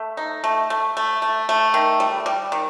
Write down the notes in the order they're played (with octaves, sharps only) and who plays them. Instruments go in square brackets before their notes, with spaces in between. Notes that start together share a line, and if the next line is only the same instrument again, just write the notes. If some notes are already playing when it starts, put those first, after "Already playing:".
Already playing: [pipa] A3
D#4
A3
A3
A3
A3
A3
D#3
G3
G3
D#3